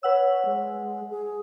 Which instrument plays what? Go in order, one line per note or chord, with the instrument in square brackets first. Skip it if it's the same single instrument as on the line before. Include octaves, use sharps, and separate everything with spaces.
[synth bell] B4 F#5 E6 [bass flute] C#5
[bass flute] G#3
G#4